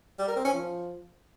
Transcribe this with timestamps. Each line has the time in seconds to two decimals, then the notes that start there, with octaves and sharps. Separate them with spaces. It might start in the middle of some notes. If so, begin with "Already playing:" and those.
0.19 G3
0.28 A#4
0.36 C4
0.45 C#4
0.53 F3